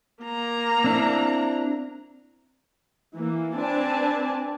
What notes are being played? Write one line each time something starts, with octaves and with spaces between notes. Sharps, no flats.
A#3 A#5
C4 D4 E4
E3 A#3
C4 D4 B4 D5 G#5 A5